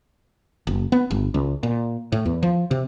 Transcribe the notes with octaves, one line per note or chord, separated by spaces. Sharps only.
F#1
B3
G1
C#2
A#2
A2
E2
F3
C3